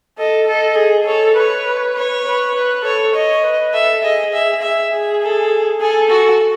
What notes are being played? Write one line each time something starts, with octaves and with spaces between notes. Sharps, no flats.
A4 D#5
A4 D#5
G#4
A4 C#5
B4 C#5
C#5
B4
B4
A4 C#5
C#5 D#5
B4
A4 E5
G#4 D#5
E5
E5
G#4
A4
G#4 A4
F#4